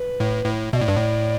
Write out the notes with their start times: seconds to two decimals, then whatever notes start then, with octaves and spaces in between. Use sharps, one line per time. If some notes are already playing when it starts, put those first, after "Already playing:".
Already playing: B4
0.20 A2
0.46 A2
0.73 B2 E5
0.76 D5
0.81 A2
0.88 G2
0.97 A2